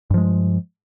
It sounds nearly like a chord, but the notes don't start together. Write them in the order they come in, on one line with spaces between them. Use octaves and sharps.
G2 F3 G#3